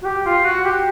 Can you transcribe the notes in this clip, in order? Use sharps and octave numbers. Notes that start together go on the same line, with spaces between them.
F#4
G4
F4
F#4
G4